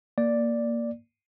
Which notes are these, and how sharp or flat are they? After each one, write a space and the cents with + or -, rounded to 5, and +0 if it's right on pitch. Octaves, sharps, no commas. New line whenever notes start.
A#3 +0 D5 +0